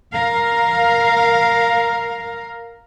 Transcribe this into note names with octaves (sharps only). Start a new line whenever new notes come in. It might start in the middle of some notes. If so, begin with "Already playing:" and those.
A#4 F5